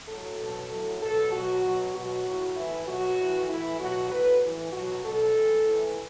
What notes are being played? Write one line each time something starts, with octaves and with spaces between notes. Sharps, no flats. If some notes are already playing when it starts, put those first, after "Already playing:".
A2 F#3 A4
B2 F#3
A2 F#3
B2 F#3 A4
B2 F#3 F#4
B2 F#3
B2 F#3 F#4
A2 F#3
A2 E3 E4
B2 F#3 F#4
A2 E3
A2 E3 E4
B2 F#3 F#4
A2 F#3 B4
A2 E3
B2 F#3 F#4
B2 F#3 A4
A2 E3
A2 E3